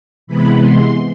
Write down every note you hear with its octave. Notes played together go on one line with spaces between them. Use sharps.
C3 E3 G#3 B3 B5
C6